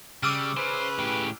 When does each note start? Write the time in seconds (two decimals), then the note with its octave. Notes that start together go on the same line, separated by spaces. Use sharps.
0.23 C#3 G3 D6 E6 F6
0.57 C#3 B4 C5
0.99 A2 G4